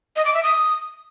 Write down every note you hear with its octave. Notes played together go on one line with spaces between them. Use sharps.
D#5
D6
E5
D#6